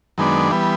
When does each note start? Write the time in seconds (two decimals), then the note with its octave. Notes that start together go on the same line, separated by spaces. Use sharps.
0.18 F#2 D#3 G#3 B3 D4
0.51 E3 G3 B3